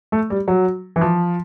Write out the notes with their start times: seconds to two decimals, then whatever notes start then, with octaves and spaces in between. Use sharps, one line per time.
0.12 A3
0.30 G3
0.48 F#3
0.96 E3
1.01 F3